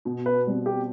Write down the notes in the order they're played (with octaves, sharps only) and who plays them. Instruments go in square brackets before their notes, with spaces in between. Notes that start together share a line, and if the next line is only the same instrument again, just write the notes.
[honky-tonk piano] B2
[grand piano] B4
[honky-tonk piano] G3 C4
[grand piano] G4